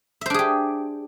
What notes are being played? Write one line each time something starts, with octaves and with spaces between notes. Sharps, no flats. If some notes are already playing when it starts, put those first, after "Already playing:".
D4 G4 G#4 C5 E5